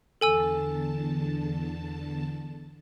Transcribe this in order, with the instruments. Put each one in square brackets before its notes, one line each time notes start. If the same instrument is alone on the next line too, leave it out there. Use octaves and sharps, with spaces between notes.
[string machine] E2 D3 A5 [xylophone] A4 G#5 E6